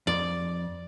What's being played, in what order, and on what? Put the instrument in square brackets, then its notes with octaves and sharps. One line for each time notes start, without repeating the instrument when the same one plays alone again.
[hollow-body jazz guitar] F2 [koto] D5